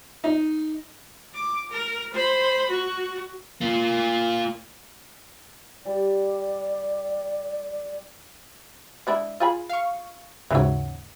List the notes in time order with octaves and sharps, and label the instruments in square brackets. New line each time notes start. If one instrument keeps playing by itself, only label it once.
[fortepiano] D#4
[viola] D6
A#4
C5 B5
F#4
[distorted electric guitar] A#3 F4
[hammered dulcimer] G3 [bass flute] D5
[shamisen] G#3 D4 E4
F4 G#4 B5
[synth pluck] F5 C#6
[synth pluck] D#2 G#2 C#3 [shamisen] E3 F#3